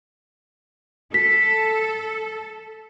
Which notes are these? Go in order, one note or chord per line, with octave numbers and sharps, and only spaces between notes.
A4 B6